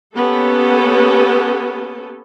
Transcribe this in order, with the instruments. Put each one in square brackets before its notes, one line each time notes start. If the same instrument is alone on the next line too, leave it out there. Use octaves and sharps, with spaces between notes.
[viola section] A#3 B3 C#4 G4 A4